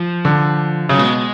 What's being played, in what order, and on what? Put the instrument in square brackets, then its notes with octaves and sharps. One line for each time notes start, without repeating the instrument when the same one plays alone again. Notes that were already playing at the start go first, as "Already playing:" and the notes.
Already playing: [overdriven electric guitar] F3
[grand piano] D3
[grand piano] C#3 [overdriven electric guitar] F#3
[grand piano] B2 [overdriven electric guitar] G#3